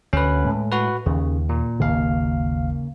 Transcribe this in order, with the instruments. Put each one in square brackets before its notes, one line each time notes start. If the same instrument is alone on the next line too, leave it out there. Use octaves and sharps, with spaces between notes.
[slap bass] D2 [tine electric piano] C#4 B4
[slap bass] A2 G#3
[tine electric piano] F#4 B4
[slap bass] D#2 [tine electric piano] C#3
[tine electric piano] A#2
[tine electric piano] G#1 D#2 F5 [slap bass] C#3 A#3